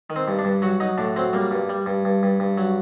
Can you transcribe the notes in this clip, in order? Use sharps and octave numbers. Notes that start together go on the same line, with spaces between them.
D#3
C4
G2
D4
G2
F#3 F#4
F#3 D#4
A2 D4
F#3 C4
G3 A#3
G2
G3
G2
G2
G2
G2
F#3